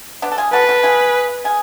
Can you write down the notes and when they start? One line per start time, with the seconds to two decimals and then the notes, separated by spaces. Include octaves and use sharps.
0.22 B3 D4
0.32 A4
0.38 F4 G#4
0.53 F#4 A4 B4
0.69 F#4 A4
0.83 F4 G#4
1.44 F4 G#4